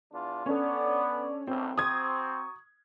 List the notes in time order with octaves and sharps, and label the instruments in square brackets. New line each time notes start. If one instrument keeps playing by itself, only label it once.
[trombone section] E2 D4 F4
[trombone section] B3 [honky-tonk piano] C#4 D4 A4 [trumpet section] D5
[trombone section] B1 F#2 A2 [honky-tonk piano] C4 [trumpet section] D4
[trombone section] C4 [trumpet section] F#4 A#5 C#6 [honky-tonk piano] D#6 G#6